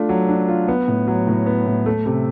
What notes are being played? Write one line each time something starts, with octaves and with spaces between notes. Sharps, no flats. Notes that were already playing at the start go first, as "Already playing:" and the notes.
Already playing: A3 D4 F4
F#3
D4
F4
B3
A2
F#3
A2
B3
A2
A3
C3